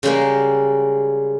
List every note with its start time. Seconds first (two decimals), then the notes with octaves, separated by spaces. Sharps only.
0.03 C#3 G3 G#3 A#3